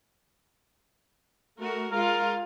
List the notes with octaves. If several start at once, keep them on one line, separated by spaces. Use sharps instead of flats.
A3 F#4 A#4
G#3 F4 A#4 F5